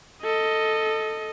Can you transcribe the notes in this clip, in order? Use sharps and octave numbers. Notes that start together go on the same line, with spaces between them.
A4 D#5